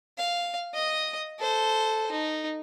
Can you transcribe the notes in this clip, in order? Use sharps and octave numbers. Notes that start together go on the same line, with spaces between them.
F5
D#5 D#6
A4 C5
D#4